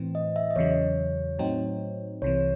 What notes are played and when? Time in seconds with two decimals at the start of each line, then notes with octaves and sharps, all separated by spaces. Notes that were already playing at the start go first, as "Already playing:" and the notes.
Already playing: A2 E3 C4
0.15 D#5
0.36 E5
0.51 D#5
0.56 E2 C#3 F#3 C#5
1.39 A2 F#3 C4 D#4
2.22 C2 C3 E3 C#5